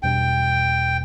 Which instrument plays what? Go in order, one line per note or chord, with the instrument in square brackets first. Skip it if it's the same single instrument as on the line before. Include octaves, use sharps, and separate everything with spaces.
[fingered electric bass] E2 B2 G3 D4 [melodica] G5